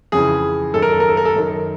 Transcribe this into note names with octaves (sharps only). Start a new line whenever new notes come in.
F2 C#3 E3 G#4
F#2 D#3 A4
A#4
A4
A#4
A4
A#4
A4
F#2 D#3